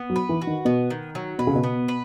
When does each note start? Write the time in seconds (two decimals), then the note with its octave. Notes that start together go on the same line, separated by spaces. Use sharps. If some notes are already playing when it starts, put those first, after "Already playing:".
Already playing: B3
0.10 F#3
0.16 B4
0.29 E3
0.41 F#4
0.47 D#3
0.65 B2 B3
0.90 D#3
1.15 F#3
1.39 B2 B4
1.47 C#3
1.55 B2
1.63 B3
1.88 B4